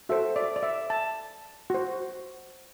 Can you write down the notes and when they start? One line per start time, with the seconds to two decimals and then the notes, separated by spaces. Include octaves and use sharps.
0.09 F#4 A4 C5 E5
0.36 D5
0.56 D5
0.63 E5
0.90 A5
1.70 F#4 C5